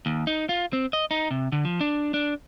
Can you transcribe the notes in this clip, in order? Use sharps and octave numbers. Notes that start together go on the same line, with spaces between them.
D#2
D#4
F4
C4
D#5
D#4
C3
D3
F3
D4
D4